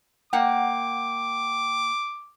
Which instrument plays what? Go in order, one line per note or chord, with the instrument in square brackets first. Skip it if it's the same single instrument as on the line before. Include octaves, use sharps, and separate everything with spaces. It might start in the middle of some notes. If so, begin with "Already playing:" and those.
[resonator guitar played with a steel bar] A#3 F#5 [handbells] G5 [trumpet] D6